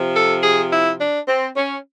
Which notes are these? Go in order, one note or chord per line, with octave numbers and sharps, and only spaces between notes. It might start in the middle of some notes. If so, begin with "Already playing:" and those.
Already playing: C3 F3
A4
G#4
E4
D4
C4
C#4